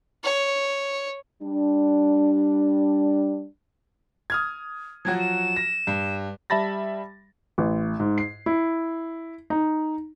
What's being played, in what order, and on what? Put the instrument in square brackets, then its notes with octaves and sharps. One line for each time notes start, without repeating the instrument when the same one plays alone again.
[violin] C#5
[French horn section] G3 D4
[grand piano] D#6 F6 G#6
[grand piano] F3 F#3 F#4 [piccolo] G#6
[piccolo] E7
[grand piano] A#6
G2
[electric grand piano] G3 E5 A5 B5 A6 A#6
[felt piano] A1
G#2
C7
E4
D#4